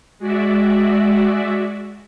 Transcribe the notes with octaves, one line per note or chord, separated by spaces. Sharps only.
G#3 F#4 D5 E5